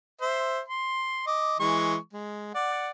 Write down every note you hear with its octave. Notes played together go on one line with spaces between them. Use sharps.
C5 E5
C6
D#5 D6
E3 G#3 C#6
G#3
D5 F#5